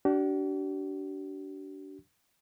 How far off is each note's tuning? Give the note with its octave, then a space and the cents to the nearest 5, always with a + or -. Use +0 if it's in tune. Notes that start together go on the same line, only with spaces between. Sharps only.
D4 -20 F#4 +45